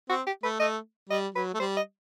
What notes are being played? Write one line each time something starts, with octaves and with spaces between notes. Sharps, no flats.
C4 F#4
G4
A3 B4
A3 D#5
G3 D#5
F#3 B4
A3
G3 C5
D#5